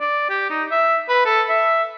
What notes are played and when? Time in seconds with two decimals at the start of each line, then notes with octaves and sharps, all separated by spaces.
0.01 D5
0.30 G4
0.50 D#4
0.71 E5
1.09 B4
1.26 A4
1.49 E5